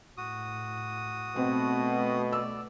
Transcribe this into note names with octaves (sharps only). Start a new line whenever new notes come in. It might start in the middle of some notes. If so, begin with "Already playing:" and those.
A2 F#4 D#6
B2 A3 C4
D5 E6